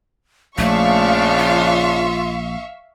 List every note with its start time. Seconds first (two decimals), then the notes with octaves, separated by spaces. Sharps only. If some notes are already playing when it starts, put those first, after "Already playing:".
0.58 A#1 C#3 F3 A3 D4 E5 F5 C#6
1.38 F4